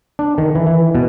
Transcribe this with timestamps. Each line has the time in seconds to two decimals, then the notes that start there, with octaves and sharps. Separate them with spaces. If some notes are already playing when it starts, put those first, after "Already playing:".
0.19 D4
0.38 D#3
0.55 E3
0.67 E3
0.95 B2